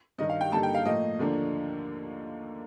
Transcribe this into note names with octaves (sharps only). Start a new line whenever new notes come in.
G2 D#3 G3 D#5
F5
G5
G2 D3 G3 A#3 D#4 A5
G5
F5
A2 F3 A#3 D#5
D#2 D3 F3 A#3 D4